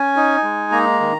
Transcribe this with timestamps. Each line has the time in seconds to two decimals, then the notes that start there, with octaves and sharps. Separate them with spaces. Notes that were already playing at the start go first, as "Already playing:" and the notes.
Already playing: C#4 G#5
0.16 D#4
0.43 G#3
0.72 A#3 A#5
1.00 D#3